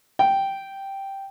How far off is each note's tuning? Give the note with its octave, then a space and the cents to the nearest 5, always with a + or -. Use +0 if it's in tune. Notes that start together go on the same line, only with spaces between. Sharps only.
G5 -5